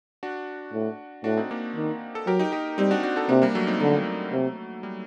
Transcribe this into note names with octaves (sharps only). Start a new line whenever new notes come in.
D4 F#4
A2
A2 D4 F#4
C4 D#4
A#3 D4
D#3
A4
F#3 G4 A#4
D#4 G4
D#4 G4
G3 C4 D#4
D4 F#4
D4 F#4
F#4 A4
C3 A#3 D4
G3 A#3
F#3 A3
C4 D#4
D3 F#3 A3
C3
G3